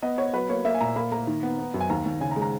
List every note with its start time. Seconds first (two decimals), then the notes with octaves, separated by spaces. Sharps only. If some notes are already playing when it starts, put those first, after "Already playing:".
0.02 B3 D#5
0.18 B3 C#5
0.33 F#3 B4
0.49 A#3 C#5
0.65 A#3 E5
0.75 G#5
0.81 A#2 A#5
0.96 A#3 B5
1.12 A#3 A#5
1.27 D#3
1.43 B3
1.59 B3
1.74 F#2
1.81 G#5
1.89 D#2 A#5
2.06 D#2
2.21 C#3 G#5
2.31 A#5
2.36 G#3
2.42 A#5